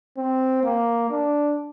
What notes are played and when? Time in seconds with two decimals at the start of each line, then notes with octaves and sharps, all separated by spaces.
0.18 C4
0.63 A#3
1.10 D4